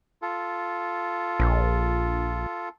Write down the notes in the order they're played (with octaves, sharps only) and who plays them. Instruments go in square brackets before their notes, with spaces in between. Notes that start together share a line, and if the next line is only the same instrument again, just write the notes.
[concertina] F4 A4
[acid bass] A#1